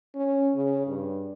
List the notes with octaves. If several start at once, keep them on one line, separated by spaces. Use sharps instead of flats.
C#4
C#3
G2